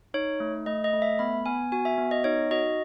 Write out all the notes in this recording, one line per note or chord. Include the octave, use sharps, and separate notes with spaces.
D#4 C#5
A3
A3 D#5
D#5
A3
E5
B3 B5
B3 G#5
F#4 G#5
E5
B3
D#5
D#4 C#5
F#4 D#5